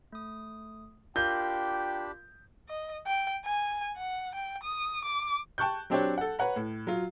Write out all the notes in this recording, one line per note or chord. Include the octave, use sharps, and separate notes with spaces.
A3 D#6
D4 F4 G4 A#4 F5 G5 B5 G6
D#5
G5
G#5
F#5
G5
D#6
D6
G5 A5 C#6 F#6 G6
F#3 C4 D4 G4 C5 C#5
A4 F#5
B4 C#5 F#5 A#5
A2
F#3 F4